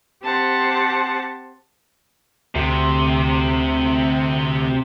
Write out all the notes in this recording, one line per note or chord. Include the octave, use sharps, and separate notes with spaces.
C4 G4 C5 F#5 A5
D2 C3